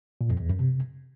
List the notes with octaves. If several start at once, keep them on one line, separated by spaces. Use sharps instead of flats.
A#2
F2
E2
F#2
C3